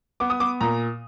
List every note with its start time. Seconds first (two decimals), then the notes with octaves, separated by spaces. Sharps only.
0.20 B3 D6
0.30 D#6
0.40 B3 D6
0.61 A#2 A#5